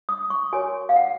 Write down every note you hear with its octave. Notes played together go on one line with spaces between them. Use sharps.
D#6
C#6
F#4 A#4 C#5 G#5
F5
F#5